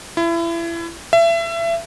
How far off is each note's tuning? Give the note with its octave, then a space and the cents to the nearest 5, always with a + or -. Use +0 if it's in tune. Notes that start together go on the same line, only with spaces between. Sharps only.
E4 +30
E5 +30